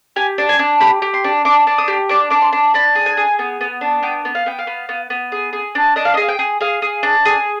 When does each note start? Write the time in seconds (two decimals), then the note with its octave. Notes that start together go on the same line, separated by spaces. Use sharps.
0.16 G4 G#5
0.38 D4
0.49 G#5
0.59 D4
0.80 G4 B5
1.02 G4
1.14 C6
1.24 D4
1.45 D4 D6
1.67 D4
1.78 D#6
1.88 G4
2.09 D4 D6
2.30 D4 D6
2.42 C6
2.53 D4
2.74 D4 B5
2.95 G#4
3.06 G#5
3.17 G#4
3.39 B3
3.61 B3
3.81 D4
4.03 B3 G5
4.25 B3
4.35 F5
4.46 B3 G5
4.59 F5
4.67 B3
4.89 B3
5.10 B3
5.32 G#4
5.53 G#4
5.75 D4
5.96 D4 D#5
6.05 F5
6.14 D#5
6.17 G#4 F5
6.28 G5
6.39 G#4
6.61 G#4 F5
6.82 G#4
7.03 D4
7.25 G#4